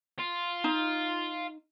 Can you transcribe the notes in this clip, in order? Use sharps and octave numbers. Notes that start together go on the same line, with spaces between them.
F4
D#4